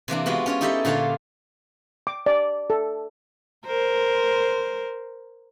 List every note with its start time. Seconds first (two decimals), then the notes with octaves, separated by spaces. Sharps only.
0.08 C3 E3 A#3 D4
0.26 G#3 B3 F4 F#4
0.46 C#4 F4 C#5
0.61 D#4 E4 G4 A4 D#5 E5
0.85 A#2 D3 F4 C#5 F5 A5
2.07 D6
2.26 D5
2.70 A4
3.66 A#4 C5